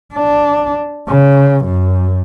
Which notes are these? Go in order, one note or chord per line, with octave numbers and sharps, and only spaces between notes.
D4
C#3
F#2